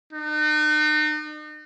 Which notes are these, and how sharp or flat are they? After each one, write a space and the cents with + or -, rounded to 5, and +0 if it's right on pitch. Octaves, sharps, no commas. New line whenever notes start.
D#4 -40